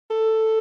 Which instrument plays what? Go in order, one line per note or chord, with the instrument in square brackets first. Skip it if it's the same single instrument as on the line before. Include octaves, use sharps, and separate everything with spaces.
[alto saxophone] A4